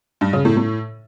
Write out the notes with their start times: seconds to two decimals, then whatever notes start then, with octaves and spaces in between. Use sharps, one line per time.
0.21 G2
0.33 C#3
0.45 A2
0.57 A2